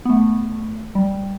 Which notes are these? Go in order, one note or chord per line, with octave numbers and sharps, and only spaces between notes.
B3
A3
G3